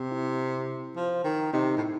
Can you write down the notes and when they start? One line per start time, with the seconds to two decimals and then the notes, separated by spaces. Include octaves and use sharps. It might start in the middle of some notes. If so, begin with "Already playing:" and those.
Already playing: C3
0.11 E4
0.96 F3
1.24 D#3
1.53 C3 D#4
1.77 A2